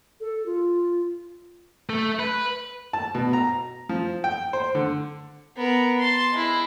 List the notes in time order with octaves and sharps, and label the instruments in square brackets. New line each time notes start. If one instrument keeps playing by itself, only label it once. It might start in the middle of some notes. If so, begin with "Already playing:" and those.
[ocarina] A4
F4
[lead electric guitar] A3
B4
[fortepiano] A5
B2
A#5
F3
G5
C5
D3
[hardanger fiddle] B3 A#4
A5 C6
G#3 E4